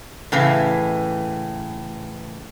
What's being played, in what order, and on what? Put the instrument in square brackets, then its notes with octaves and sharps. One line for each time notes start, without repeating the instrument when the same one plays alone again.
[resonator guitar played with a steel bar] A2 C#3 E3